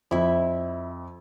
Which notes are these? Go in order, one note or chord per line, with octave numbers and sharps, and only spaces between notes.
F2 E4 E5